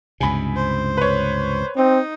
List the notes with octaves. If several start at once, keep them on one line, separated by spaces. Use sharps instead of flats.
C#2 G2 C3 G#5 B5
C5
B4 C#5
C4 D#4